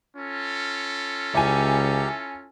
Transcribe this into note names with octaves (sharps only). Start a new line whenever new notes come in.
C#4 F4 A4
C#2 E4 G4 G#5 A#5